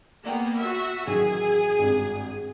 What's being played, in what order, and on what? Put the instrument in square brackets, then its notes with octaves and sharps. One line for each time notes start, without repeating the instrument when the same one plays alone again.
[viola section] A#3 B3 [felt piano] D5 F#5 G5
[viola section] F#4 E5
[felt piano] A1 D#3 F#3 [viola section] G#4
[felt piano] G#1 G2 C3